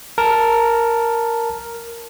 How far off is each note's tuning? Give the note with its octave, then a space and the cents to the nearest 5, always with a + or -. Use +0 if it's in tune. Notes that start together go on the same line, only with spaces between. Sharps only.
A#4 +0 A5 +0